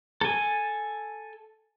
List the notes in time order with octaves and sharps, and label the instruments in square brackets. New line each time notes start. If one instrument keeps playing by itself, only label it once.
[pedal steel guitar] A4 G#5